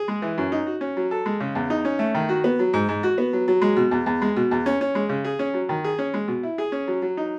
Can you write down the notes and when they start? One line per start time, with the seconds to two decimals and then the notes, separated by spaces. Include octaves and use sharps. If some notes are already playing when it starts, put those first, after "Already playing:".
Already playing: G#4
0.08 G#3
0.22 E3
0.38 F#2
0.52 D#4
0.66 F#4
0.81 C#4
0.97 F#3
1.11 A4
1.26 G#3
1.40 C#3
1.55 E2
1.70 D#4
1.85 C#4
1.99 A3
2.15 D#3
2.29 F#4
2.44 B3
2.59 F#3
2.73 G#2
2.89 G#2
3.03 F#4
3.18 B3
3.33 F#3
3.48 F#3
3.62 G#3
3.77 B2
3.91 E2
4.06 E2
4.22 G#3
4.37 B2
4.51 E2
4.66 C#4
4.81 C#4
4.95 G#3
5.09 C#3
5.24 G#4
5.39 C#4
5.54 F#3
5.69 D#3
5.84 G#4
5.98 C#4
6.14 G#3
6.28 B2
6.43 E4
6.58 G#4
6.72 C#4
6.88 F#3
7.02 F#3
7.17 D#4